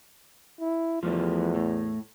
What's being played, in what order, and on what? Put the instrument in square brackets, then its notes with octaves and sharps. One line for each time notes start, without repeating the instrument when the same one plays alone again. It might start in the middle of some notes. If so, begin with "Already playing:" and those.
[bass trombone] E4
[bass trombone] E2 [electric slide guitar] F3 G3 A3
[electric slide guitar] A2